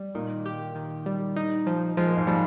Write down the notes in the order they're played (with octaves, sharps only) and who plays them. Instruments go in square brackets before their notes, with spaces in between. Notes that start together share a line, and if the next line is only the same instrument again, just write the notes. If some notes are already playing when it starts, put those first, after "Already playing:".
Already playing: [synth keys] G3
[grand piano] A#2 A#3 [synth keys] D#3
[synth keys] G4
D#3
G3
D#4
F3
[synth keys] F3 [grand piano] G#3
[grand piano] A#3
G#2 G#3
[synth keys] F3 [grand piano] G3